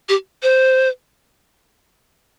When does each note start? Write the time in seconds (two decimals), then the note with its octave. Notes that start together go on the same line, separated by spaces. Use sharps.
0.09 G4
0.43 C5